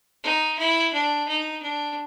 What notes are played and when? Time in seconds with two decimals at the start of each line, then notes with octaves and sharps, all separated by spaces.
0.24 D#4
0.59 E4
0.94 D4
1.28 D#4
1.62 D4